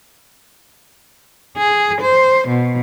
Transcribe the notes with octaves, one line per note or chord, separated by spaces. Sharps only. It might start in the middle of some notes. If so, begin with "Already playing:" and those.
G#4
C5
B2